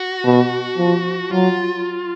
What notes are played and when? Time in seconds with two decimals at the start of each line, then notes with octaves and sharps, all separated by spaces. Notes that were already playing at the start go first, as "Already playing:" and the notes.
Already playing: F#4
0.25 B2
0.78 F3
1.31 F#3 F4